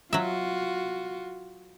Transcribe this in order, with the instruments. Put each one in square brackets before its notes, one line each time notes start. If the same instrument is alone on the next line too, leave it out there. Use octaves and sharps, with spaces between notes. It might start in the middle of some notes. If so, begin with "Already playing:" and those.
[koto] F#3 E5 [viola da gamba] F4 F#4